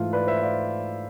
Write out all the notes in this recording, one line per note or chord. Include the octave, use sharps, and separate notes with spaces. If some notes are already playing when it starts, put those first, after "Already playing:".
Already playing: G#2 E3 A3 F4
B4 D5
C5 E5
D5 F5